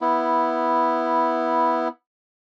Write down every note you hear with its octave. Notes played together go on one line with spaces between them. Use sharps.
B3 E4